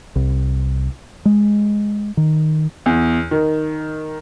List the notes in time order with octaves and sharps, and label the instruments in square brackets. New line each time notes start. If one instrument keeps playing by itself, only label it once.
[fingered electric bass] C2
G#3
D#3
[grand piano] E2
D#3